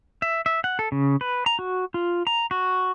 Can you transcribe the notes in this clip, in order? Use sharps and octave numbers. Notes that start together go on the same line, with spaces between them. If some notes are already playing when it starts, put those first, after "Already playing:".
E5
E5
F#5
A4
C#3
B4
A#5
F#4
F4
A#5
F#4